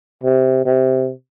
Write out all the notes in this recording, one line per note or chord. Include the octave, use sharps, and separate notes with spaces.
C3
C3